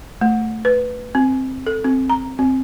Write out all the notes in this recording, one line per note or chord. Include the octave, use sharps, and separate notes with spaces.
A3
B4
C4
A4
C4
A#5
C4